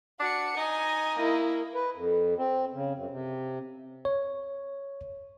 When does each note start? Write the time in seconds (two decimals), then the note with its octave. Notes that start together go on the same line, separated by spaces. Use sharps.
0.20 D4 F#4 C#7
0.57 D#4 D#5 G#5
1.17 A#3 E4
1.74 B4
1.95 F2
2.38 C4
2.74 C#3
2.95 F#2
3.10 C3
4.05 C#5